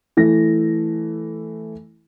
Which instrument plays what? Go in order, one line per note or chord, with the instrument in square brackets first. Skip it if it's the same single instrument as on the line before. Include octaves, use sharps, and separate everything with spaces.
[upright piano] E3 A3 A#6